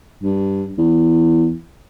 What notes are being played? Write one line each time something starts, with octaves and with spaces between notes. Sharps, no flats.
G2
E2